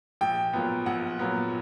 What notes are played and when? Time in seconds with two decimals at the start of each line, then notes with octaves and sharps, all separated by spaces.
0.21 A#1 G5
0.53 A#2 F#3 B3
0.86 A#1 F#5
1.19 A#2 F#3 B3